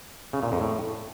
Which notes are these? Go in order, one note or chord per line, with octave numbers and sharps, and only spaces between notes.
C#3
A#2
F2
A2